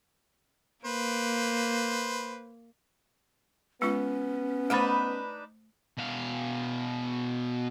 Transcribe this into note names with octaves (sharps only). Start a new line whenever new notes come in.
A#3 B4 C5
G#3 B3 C#4 F4
A3 D4 D#4 B4 C5
B2 F5